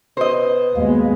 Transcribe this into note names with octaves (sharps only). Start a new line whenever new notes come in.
B2 C5 D#5
D#2 G#3 A#3 B3